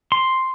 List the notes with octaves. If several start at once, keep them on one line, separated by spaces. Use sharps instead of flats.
C6